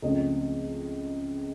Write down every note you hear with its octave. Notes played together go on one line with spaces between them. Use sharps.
C#2 C#3 F3 A3 C4 D#5